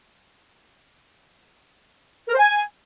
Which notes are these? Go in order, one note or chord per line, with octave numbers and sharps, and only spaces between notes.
A#4
C5
G#5